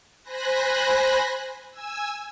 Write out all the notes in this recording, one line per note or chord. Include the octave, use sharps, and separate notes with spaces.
C5 G#5 B5 F#6 A#6
G#5 E6